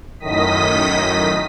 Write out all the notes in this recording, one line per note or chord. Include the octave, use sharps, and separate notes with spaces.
F#2 A2 D#3 D#5 D#6 B6